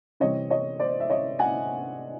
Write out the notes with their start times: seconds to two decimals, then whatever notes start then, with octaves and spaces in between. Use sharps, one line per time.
0.20 C3 E3 G3 C4 C#5 D#5
0.50 C#5 D#5
0.79 C5 D5
1.00 E5
1.10 C#5 D#5
1.39 F#5 G#5